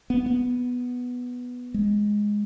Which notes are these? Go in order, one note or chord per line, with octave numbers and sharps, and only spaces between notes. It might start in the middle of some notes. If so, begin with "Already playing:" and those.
B3
B3
G#3